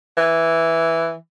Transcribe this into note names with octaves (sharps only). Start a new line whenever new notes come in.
E3